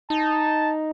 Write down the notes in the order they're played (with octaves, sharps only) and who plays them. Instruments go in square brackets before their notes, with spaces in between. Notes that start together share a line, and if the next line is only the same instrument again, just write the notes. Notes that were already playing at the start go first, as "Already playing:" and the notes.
[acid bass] D#4 [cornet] A5